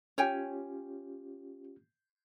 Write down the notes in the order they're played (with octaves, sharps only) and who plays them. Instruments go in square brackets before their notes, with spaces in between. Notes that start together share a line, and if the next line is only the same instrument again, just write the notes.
[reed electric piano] C#4 F4 G4 [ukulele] C#5 G5 G#5